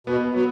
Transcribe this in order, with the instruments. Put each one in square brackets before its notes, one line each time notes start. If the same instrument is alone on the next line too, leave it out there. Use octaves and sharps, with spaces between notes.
[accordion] B2 [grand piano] B3
[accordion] F#3 [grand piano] B3